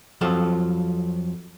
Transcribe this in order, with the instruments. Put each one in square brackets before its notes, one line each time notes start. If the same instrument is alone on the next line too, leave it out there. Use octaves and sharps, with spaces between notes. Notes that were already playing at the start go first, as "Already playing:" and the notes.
[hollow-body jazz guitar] F2 F3 F#3 F4 A4